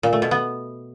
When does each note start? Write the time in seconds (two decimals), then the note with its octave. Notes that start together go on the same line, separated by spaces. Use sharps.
0.03 A#2
0.13 A3
0.22 B2
0.31 B3